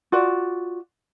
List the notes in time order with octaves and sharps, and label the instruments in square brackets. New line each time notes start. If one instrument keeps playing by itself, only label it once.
[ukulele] F4 F#4 D5